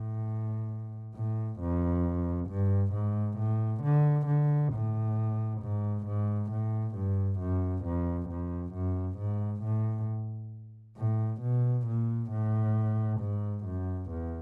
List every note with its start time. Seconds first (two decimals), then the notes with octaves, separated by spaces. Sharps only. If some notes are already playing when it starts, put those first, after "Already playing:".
Already playing: A2
1.14 A2
1.59 F2
2.49 G2
2.93 G#2
3.38 A2
3.83 D3
4.27 D3
4.73 A2
5.61 G#2
6.06 G#2
6.51 A2
6.95 G2
7.40 F#2
7.85 F2
8.29 F2
8.74 F#2
9.18 G#2
9.63 A2
10.98 A2
11.42 B2
11.87 A#2
12.31 A2
13.20 G#2
13.65 F#2
14.10 E2